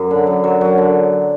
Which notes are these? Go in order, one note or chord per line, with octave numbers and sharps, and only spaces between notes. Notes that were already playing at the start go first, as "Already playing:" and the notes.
Already playing: F#2 F#3
D3
F#2
F#3
F#3
D3